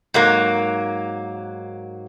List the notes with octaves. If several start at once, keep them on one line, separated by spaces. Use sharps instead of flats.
G#2 F#3 A#3